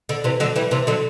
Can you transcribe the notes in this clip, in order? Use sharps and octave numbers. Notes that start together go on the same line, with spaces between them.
D3
C3 E3
D3 F#3
E3 G3
C3 E3
D3 F#3